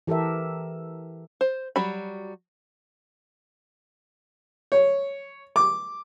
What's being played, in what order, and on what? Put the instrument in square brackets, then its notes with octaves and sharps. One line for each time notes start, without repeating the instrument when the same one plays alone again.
[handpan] E3 G4 A4 A#4 E5
[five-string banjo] C5
F#3 G3 F#4 B5
[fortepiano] C#5
D6